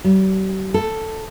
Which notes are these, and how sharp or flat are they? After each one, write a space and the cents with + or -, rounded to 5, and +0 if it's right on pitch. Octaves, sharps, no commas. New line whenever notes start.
G3 -45
A4 +5